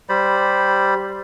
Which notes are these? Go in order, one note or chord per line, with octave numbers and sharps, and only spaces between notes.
G3 C5 D5 B5